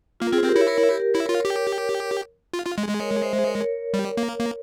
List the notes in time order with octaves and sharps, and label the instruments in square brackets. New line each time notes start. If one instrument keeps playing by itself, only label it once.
[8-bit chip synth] A#3 [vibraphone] F4
[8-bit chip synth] C4 [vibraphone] F4 G#4
[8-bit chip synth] C4 [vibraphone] G4 A#4
[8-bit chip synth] E4 [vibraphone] A#4 C#5
[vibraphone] A#4 C#5
G4 A#4
[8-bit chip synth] E4 [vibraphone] A#4 C#5
[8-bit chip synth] F4
G4
F4
F4
G#3
G#3
[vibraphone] A#4 C#5
C5 E5
A#4 C#5
[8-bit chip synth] G3
A#3
A#3